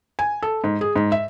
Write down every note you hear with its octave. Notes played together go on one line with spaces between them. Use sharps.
G#5
A4
G#2
G#4
G#2
E5